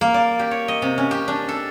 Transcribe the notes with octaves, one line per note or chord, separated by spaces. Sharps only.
A#3
D5
G4
C#5
D#5
C3
C#4
G4
D4
A4